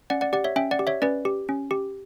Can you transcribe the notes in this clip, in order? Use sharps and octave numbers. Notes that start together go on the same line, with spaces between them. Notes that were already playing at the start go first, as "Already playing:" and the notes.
C#4 D5 F#5
D5 F#5
G4 D5 F#5
C#5 E5
C#4 E5 G5
D5 F#5
G4
C#5 E5
C#4 B4 D5
G4
C#4
G4